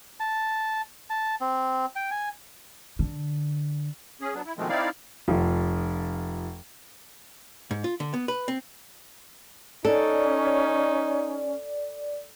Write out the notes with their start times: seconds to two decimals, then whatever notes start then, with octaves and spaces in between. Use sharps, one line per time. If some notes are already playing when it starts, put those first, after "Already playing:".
0.20 A5
1.10 A5
1.41 C4
1.96 G5
2.11 G#5
2.99 D3
4.21 C#4 G#4
4.34 F#3 B3 D4
4.45 E4
4.58 B2 D#3 F3 G#3 A3 C4
4.69 C4 D#4 E4 D5 F5
5.28 F1 F3
7.71 G#2
7.84 F4
8.00 D3
8.14 B3
8.28 B4
8.48 C4
9.85 C#4 D#4 A4 D5